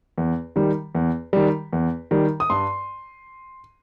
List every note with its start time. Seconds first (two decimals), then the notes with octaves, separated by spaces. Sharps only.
0.18 E2
0.56 D#3 G3
0.95 E2
1.33 D#3 G3
1.73 E2
2.11 D#3 G3
2.40 D#6
2.50 G2 C6